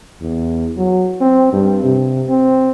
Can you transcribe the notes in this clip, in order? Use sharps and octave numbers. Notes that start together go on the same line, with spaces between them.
E2
F#3
C4
G2
C3
C4